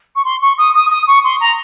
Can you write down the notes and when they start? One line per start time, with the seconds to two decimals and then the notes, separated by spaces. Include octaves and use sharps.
0.16 C#6
0.25 C6
0.41 C#6
0.58 D#6
0.75 D#6
0.91 D#6
1.07 C#6
1.24 C6
1.41 A#5